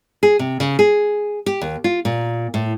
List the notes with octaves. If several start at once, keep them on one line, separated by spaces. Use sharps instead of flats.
G#4
C3
C#3
G#4
G4
D#2
F4
A#2
A2